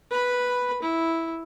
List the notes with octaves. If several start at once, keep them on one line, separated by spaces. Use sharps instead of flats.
B4 B5
E4